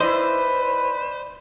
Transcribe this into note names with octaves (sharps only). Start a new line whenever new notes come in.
E4 B4 C5 D5 D#5